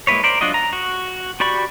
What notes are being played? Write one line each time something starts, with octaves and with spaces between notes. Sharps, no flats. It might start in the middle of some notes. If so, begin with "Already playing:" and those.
G#3 A#3 E4 B4 C#5
A#4 C5 D5
F#3 D4 F4 F#4 D#5
A#5
F#4
F#4 G4 D5 B5 C#6